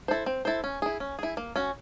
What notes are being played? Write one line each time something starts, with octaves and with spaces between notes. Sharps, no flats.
E4 A4 C5
C4
E4 A4 C5
C#4
E4 G#4
C#4
E4 G#4
A#3
C#4 F#4